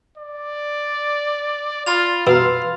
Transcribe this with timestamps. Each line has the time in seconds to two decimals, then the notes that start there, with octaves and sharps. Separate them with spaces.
0.17 D5
1.86 F4 B5 A6 F7
2.27 B2 F5 A#5 C6 E6